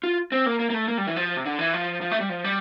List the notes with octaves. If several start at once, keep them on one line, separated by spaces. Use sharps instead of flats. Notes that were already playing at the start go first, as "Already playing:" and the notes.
F4
C4
A#3
A#3
A#3
A3
A#3
G3
E3
F3
C3
D3
E3
F3
F3
A3
G3
F3
G3